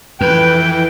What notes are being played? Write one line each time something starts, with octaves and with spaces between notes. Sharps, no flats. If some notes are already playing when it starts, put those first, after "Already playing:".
F2 E3 B4 G5